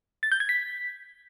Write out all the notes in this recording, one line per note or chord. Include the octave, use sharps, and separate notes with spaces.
A6
G6
G#6
B6